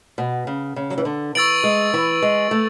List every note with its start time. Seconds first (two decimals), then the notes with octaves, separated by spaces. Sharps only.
0.18 B2
0.47 C#3
0.76 C#3
0.90 F#3
0.98 E3
1.05 D3
1.35 E3 C#6 E6 A6 D7 F#7
1.64 G#3
1.93 E3
2.22 G#3
2.51 A3